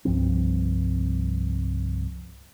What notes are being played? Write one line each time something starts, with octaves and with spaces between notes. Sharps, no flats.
C2 G2 F3 C4